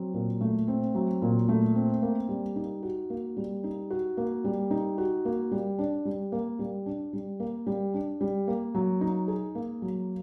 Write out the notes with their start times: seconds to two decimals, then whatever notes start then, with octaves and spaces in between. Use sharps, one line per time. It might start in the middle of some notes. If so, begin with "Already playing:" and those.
Already playing: F#3 C4
0.14 A#2
0.41 A3
0.68 C4
0.95 F#3
1.22 A#2
1.48 A3
1.75 C4
2.02 A#3
2.29 G3
2.56 D#4
2.83 F#4
3.10 A#3
3.37 G3
3.64 D#4
3.90 F#4
4.17 A#3
4.44 G3
4.71 D#4
4.98 F#4
5.25 A#3
5.52 G3
5.79 D4
6.05 G3
6.32 A#3
6.59 G3
6.86 D4
7.13 G3
7.40 A#3
7.67 G3
7.94 D4
8.21 G3
8.48 A#3
8.75 F#3
9.01 D#4
9.28 G#4
9.55 A#3
9.82 F#3